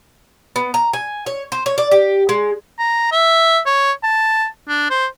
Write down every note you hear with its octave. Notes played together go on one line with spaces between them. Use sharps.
B3
A#5
G#5
C#5
C5
C#5
D5
G4
G#3
A#5
E5
C#5
A5
D4
C5